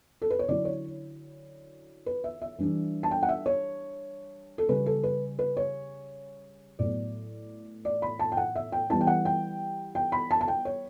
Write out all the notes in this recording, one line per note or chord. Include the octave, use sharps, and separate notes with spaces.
A4
B4
C#5
D3 F#3 C#4 E4 D5
C#5
B4
E5
E5
E3 G3 D4
A5
G5
F#5
E5
C#5
A4
C#3 G3 C#4 B4
A4
B4
B4
C#5
A2 F#3 B3 D5
D5
B5
A5
G5
F#5
E5
G5
E3 G3 B3 E4 A5
G5
F#5
G5
G5
B5
A5
A5
G5
C#5